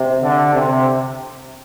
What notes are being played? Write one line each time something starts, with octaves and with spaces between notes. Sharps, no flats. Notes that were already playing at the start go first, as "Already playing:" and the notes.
Already playing: C3
D3
C3